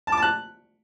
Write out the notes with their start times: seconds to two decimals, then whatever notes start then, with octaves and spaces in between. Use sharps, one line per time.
0.07 A5
0.12 D6
0.17 A5
0.22 F#6